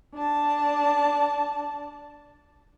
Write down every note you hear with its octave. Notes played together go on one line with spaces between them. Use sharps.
D4 A5